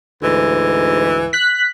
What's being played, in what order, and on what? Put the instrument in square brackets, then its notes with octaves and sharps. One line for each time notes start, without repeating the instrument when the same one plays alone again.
[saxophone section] D2 G#2 E3
[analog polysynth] F#6 B6